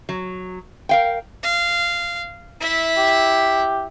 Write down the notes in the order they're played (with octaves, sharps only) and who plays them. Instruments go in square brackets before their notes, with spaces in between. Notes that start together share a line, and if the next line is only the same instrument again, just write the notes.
[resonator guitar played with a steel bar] F#3
A#4 F5 G5
[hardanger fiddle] F5
E4 E5
[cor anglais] G4